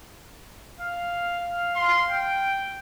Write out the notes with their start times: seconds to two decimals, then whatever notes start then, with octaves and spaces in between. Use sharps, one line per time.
0.80 F5
1.76 C6
2.10 G5